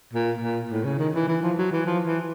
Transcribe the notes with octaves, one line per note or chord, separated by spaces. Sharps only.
A#2
A#2
A2
C#3
D#3
E3
E3
F3
F#3
E3
F3
E3